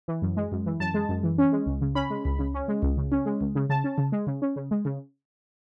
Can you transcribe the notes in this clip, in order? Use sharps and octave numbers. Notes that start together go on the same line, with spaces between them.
E3
F#2
G#3
F#2
E3
F#2 A5
G#3
F#2
E3
C#4
G#3
C#2
C#3
C#4 B5
G#3
C#2
C#3
C#4
G#3
C#2
C#3
C#4
G#3
C#2
C#3
C#3 A5
C#4
C#3
G#3
C#3
C#4
C#3
G#3
C#3